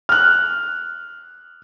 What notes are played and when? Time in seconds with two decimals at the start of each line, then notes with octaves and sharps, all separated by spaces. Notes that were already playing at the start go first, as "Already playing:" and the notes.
0.09 F6 F#6